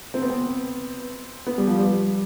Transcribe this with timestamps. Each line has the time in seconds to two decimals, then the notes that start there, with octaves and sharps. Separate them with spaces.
0.14 C4
0.22 B3
0.30 C4
1.47 B3
1.58 G3
1.67 F3
1.77 G3